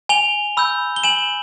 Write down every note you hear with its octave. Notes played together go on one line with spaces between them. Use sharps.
G#5 F7 G7
B5 E6 G6
G7
G#5 E7 F#7